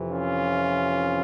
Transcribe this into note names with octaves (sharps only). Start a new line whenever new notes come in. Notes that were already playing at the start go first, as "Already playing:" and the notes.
Already playing: F2 C3 E3
C#4 F4